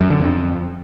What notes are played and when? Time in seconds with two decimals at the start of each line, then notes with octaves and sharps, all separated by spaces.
0.01 F#2
0.10 D3
0.20 F2